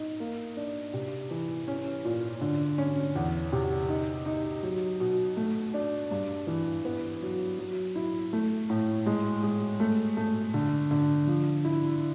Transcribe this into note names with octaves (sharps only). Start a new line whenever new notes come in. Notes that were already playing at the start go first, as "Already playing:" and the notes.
Already playing: D#4
A#3
D4
C3
E3
C#4
A#2
D3
C#4
E2
C3
D#4
D#4
F#3
B2
A3
D4
G2
E3
B3
F#3
F#3
E4
A3
A2
G#3
G#3
A3
A3
D3
D3
F3
E4